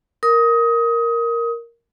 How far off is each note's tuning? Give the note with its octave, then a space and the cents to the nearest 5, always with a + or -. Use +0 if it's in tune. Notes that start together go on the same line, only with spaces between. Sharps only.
A#4 +0 D#6 +25